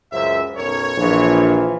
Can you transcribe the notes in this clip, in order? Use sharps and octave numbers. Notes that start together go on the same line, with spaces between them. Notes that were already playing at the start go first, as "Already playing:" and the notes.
C#2 F#2 C5 E5
B1 F#2 A#4 C#5
A#1 E3 F3